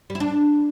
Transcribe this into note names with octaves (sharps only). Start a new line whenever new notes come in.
G3
E4
D4